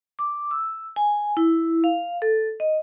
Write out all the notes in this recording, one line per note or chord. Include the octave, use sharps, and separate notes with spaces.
D6
E6
G#5
E4
F5
A4
D#5